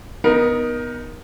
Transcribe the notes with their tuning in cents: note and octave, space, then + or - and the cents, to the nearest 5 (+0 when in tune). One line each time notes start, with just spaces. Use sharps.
B3 +0 D#4 +0 A#4 +25